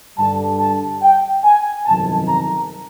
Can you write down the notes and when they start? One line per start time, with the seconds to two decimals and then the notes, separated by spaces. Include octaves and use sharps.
0.18 G2 D3 G3 A5
0.60 A5
1.02 G5
1.44 G#5
1.86 G1 F2 C3 D#3 F#3 A5
2.28 A#5